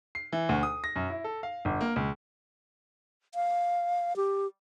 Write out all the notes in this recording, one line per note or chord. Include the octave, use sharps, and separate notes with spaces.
C7
E3
D2
D#6
A#6
F#2
E4
A4
F5
G1
A#3
C#2
F5
G4